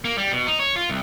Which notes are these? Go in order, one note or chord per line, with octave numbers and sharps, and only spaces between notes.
A#3
G3
B2
D#4
C#5
F4
C2